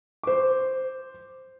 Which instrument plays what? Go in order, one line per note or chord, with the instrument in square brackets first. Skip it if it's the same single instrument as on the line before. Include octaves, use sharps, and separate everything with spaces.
[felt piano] C5 D6